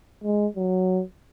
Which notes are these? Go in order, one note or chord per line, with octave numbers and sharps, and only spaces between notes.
G#3
F#3